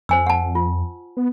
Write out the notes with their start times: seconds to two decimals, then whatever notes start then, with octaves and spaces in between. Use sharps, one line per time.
0.09 F2 C5 G#5 E6
0.27 F#5 A5
0.55 F4
1.17 B3